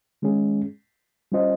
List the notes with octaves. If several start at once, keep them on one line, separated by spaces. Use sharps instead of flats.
D#3 G#3 C#4 G#4
G3 C#4 F4 C5 D#5